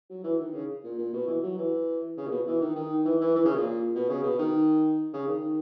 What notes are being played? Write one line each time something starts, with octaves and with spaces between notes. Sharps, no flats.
F#3
E3
D#3
C#3
A#2
A#2
B2
E3
F#3
E3
C#3
A#2
B2
E3
D#3
D#3
E3
E3
E3
C#3
A#2
B2
C#3
B2
D#3
C#3
D#3